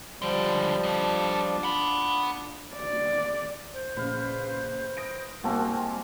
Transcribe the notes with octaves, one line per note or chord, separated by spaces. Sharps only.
C#2 D3 F3 G3
D4 F4 A4 D#5
F#5 B5
D5
C5
A#1 C#3 B4 F5
D#6 A#6 D7
C2 G#3 A#3 C4 F#4 A#4 A5